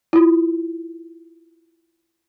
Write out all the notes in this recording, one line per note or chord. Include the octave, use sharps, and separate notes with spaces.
E4 F4